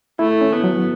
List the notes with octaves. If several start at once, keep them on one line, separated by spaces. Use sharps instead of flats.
A3 E4
C#4
B3
F#3